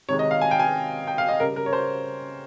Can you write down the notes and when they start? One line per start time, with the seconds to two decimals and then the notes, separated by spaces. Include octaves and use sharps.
0.08 C3 D#3 G#3 C#5
0.19 D#5
0.31 F5
0.41 G#5
0.51 G5
0.59 G#5
1.07 G5
1.18 F5
1.28 D#5
1.40 C#3 G3 A#4
1.56 A#4
1.66 C#5
1.73 C5